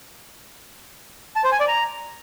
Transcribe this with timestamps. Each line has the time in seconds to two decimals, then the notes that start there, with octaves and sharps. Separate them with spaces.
1.36 A5
1.44 C5
1.52 G#5
1.60 D5
1.68 A#5